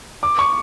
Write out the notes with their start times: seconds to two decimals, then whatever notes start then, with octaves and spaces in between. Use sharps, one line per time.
0.23 D6
0.39 C#6